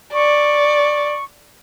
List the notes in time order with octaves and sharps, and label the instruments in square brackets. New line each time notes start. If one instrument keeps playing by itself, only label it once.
[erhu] D5 [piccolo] C#6